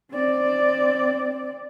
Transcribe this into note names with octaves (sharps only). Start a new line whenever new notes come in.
C4 D5